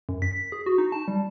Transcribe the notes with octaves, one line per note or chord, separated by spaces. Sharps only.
F#2
B6
G#4
F#4
D#4
A5
G3